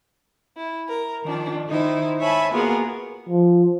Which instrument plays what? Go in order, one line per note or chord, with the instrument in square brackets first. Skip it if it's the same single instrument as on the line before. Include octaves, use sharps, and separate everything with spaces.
[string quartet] E4
A#4
D#3 F3 D4
D#3 D#4 E4 C5
C#5 E5 G#5 A5 B5
A#3 B3 F4 F#4 G#4 A#4
[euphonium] F3